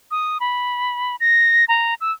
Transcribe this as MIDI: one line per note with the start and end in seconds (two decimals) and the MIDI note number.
0.11 0.38 87
0.40 1.16 83
1.20 1.65 94
1.68 1.94 82
2.01 2.12 88